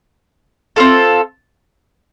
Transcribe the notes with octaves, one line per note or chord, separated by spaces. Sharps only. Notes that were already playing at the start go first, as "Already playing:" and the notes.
C4 F4 A4